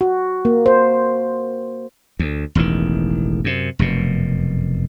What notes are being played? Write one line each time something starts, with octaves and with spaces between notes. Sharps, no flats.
F#4
A#3
C5
D2
E1 A1 E2 D#3
F#2 C3
F1 F#2 B2